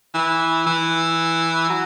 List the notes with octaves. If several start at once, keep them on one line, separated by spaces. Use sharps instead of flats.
E3
E3
F#3